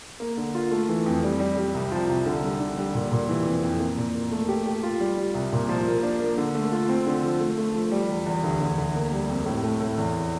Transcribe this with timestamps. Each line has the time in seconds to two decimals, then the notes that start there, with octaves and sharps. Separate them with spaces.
0.20 A#3
0.37 D3
0.55 F4
0.71 A3
0.89 E3
1.06 F2
1.23 G3
1.40 G3
1.57 G3
1.74 C2
1.92 F3
2.09 C2
2.26 D3
2.43 G3
2.60 D3
2.77 G3
2.94 A#2
3.12 A#2
3.29 E3
3.46 F2
3.63 F2
3.80 A#3
3.97 A#2
4.15 A#3
4.32 A3
4.49 G4
4.66 G4
4.83 F4
5.00 G3
5.17 G3
5.34 C2
5.52 A#2
5.69 F3
5.86 A#3
6.03 D4
6.20 A#3
6.37 D3
6.55 A3
6.72 F4
6.89 C4
7.06 D3
7.23 F3
7.40 A3
7.58 A3
7.75 F3
7.92 G3
8.09 E2
8.26 E2
8.43 D2
8.60 D2
8.78 D2
8.95 A#3
9.12 G3
9.29 F2
9.46 A2
9.64 A3
9.80 A2
9.98 E2